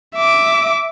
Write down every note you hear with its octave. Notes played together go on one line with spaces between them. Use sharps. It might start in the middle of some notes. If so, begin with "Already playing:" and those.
E5 D6